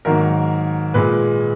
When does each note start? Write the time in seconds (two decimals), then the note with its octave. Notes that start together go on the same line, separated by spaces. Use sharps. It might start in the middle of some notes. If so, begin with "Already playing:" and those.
0.05 G#2 D#3 F#3 A#3 A#4
0.94 A#2 G#3 B4